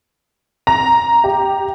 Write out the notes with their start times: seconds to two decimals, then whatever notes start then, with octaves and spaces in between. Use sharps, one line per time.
0.67 A#5
1.24 G4